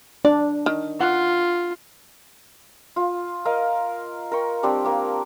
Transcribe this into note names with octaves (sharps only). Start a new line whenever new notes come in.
D4 D5
D#3
F4 F#5
F4
A#4 D#5 F5
A#4 G5 C#6
G3 C4 D4 G4
A#3 D6